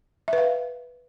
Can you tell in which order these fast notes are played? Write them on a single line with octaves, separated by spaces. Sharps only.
E5 B4 F5